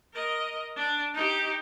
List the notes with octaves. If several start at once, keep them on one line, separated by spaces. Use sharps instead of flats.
A#4 D#5
D4
D#4 G4